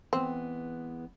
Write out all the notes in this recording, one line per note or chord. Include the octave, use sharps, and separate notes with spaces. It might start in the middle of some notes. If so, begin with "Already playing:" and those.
E3 G#3 B3 C4